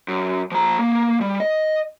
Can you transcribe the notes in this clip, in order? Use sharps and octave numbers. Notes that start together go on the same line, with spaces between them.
F#2
F3 A#5
A#3
G3
D#5